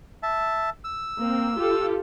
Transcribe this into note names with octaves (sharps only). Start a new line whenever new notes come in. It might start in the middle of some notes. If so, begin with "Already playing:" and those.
E5 A5
E6
A#3 C4
F4 G4 A4